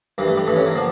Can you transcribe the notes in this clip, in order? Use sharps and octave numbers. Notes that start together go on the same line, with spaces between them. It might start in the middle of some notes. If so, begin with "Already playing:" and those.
G2 E3 A#3
A3
G3
G2 E3 A3
C#4
A#3
D3 F3